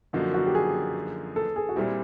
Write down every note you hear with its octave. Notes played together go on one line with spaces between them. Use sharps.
F#2 D3 F3 A#3 D#4 F#4
F#4
G4
G#4
A4
G#4
F#4
A#2 G3 C4 E4 G4